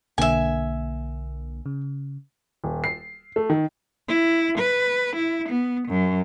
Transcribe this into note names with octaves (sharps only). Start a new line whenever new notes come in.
B1 D3 A#3 E5 G#5
C#3
D#1
C7
A3
D#3
E4
B4
E4
B3
F#2